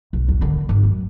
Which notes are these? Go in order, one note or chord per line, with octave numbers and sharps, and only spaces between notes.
B1
D#2
D3 D#3
G1
F#2